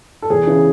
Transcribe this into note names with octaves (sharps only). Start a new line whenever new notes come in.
A4
E2 G#4
C#3 E3